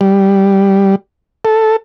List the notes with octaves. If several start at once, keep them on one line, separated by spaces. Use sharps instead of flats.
G3
A4